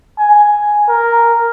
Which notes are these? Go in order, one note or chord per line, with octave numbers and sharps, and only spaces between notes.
G#5
A#4